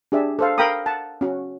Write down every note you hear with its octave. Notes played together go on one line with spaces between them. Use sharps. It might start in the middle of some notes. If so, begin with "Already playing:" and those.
D4 G4 G#4 D5 E5
A4 C5 F5
A#4 F5 G5 A#5 B5 D#6
F#5 A5
C#4 F#4